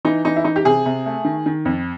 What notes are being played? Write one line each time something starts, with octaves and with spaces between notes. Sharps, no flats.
E3 D#4
E3 D#4
E4
E3 D#4
G4
C3 G#4
C3
A3
D#3
D#3
F2